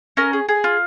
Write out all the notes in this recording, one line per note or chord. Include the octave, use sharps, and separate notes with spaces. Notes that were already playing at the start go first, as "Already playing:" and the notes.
C#4 A#4
G#4
G#4
F4